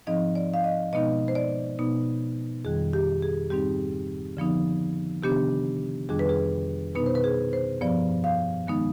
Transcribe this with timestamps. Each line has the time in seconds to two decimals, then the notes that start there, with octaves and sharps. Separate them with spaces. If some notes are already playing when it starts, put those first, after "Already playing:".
0.07 G#2 F3 C4 D#4 D#5
0.35 D5
0.54 F5
0.64 D#5
0.93 B2 G#3 B3 D#4 D#5
1.28 C5
1.35 D5
1.79 B2 B3 D#4
2.65 F2 D#3 G3 G#4
2.93 G4
3.22 G#4
3.50 G#2 G3 C4 D#4 G4
4.37 D3 F3 B3 D#4
5.23 C3 D#3 B3 D4 G4
6.09 F2 D#3 G3 D4 G#4
6.19 B4
6.29 G#4
6.95 B2 B3 D#4 B4
7.06 C5
7.15 B4
7.24 G#4
7.53 C5
7.81 G2 F3 B3 D5
8.24 F5
8.67 D#3 G#3 B3 D#4